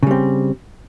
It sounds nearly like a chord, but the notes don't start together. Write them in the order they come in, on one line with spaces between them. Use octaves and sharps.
C#3 G3 C4